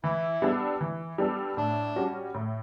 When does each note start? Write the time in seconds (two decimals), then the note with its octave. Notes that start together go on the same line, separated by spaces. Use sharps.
0.04 E3 E4
0.42 G3 B3 D4 A4
0.81 E3
1.18 G3 B3 D4 A4
1.57 A2 D4
1.96 G3 C#4 F#4
2.34 A2